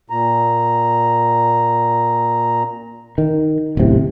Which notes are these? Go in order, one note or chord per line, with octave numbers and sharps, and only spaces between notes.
A#2 A#5
D#3
D1 A1 E2 C3